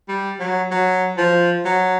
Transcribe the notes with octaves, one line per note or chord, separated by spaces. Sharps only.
G3
F#3
F#3
F3
F#3